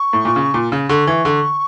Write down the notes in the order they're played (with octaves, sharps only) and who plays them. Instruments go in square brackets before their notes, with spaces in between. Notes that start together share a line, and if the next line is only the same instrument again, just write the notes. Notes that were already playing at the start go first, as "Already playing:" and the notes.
Already playing: [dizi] C#6
[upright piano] A2
A#2
C#3
A#2
C#3
[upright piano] D3 [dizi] C#6
[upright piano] E3
D3